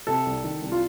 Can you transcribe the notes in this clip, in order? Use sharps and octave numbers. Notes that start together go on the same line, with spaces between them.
C3 A4
C2
D#3
C2
F4